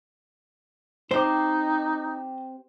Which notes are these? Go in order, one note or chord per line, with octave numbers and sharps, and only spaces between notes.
C4 D#4 G4 C5